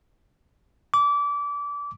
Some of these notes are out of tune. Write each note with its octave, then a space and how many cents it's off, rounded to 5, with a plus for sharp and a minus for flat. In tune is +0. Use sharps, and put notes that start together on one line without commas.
D6 -25